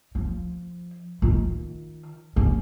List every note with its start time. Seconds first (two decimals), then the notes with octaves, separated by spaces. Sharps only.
0.15 F3
1.22 D#3 F4
2.36 C#4